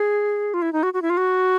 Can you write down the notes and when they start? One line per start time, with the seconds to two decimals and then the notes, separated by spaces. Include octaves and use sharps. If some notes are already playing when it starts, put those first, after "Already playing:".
Already playing: G#4
0.54 F4
0.62 E4
0.73 D#4
0.83 F#4
0.94 F#4
1.02 E4
1.10 F4
1.17 F#4